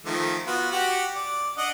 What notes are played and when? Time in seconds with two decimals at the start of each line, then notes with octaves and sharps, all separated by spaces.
0.05 D#3 F3 A3
0.46 B3 F4 F#4
0.71 F#4 G4 F#5
1.15 D5
1.57 D4 D#5 F#5